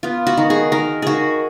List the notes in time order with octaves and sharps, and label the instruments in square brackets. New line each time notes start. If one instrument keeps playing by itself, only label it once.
[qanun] B3 F4
F#4
D#3
G#4
D#3 A#4
D#3 F#4 G#4